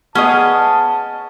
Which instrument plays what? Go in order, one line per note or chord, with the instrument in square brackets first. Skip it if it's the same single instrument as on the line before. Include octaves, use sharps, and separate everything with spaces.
[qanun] B3 G#4 [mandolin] C#4 D#5 [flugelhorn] A5